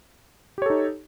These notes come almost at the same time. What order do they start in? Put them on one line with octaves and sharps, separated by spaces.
G4 C#5 A4 D#4